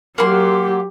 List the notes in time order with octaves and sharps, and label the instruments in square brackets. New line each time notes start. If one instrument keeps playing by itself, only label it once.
[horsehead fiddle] F#3 G4 [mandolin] A#3 F#5 C6